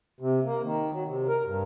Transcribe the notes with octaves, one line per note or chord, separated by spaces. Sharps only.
C3
A#3
D#3
F#3
C3
A#4
G2